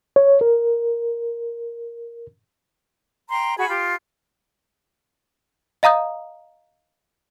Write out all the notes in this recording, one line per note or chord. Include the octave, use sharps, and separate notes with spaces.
C#5
A#4
G5 A#5 C6
F#4 G#4 G#5 B5
F4 G4
D#5 F5 A#5 D#6 G6